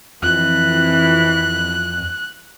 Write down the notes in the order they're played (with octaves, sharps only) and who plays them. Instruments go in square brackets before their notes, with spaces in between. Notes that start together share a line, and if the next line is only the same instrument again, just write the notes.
[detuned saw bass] F2 [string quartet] E3 [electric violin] F#6